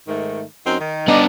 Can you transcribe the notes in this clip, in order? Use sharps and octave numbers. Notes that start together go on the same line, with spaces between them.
G#2 D#3 A3
F#2 C4 D#4
D#3
B3 D4 D#4 D5 D#5